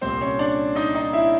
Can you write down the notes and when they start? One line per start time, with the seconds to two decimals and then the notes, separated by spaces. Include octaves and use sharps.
0.01 C2 A#2 G3 C4 C5
0.21 C#4 C#5
0.39 D4 D5
0.76 D#4 D#5
0.95 D#4 D#5
1.13 E4 E5